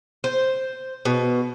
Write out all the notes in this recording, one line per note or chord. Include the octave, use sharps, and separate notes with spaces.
C5
B2